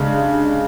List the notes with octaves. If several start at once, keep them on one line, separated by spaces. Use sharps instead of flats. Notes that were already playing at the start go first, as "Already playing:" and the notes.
Already playing: C#3 G#3 D4